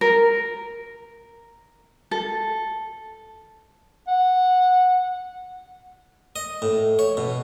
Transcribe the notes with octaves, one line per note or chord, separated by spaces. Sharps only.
A#4
A4
F#5
D#5
A2
C#5
B2